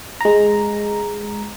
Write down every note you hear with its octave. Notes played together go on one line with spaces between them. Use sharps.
G#3 A#5